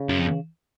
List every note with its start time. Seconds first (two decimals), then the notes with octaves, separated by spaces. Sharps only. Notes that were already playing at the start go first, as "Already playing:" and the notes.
Already playing: C#3
0.09 F#2
0.19 F2